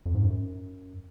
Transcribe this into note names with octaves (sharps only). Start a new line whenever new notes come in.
F2
G#2
F#2